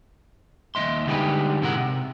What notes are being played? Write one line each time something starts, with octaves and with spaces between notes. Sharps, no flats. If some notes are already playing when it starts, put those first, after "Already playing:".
D#2 A#3 D#5 E5 C6
D3 G3 G#3 D#4 G4 B4
G#2 C3 G#3 E4 A#4 F#5
C3